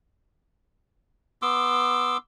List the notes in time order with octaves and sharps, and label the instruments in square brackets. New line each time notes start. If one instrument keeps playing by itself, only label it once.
[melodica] B3 C6 D6 E6